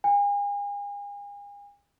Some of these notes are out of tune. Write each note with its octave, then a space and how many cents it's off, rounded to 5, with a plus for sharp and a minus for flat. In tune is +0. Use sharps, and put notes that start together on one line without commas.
G#5 -40